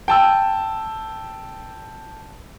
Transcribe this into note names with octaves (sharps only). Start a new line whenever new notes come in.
G5 A5 E6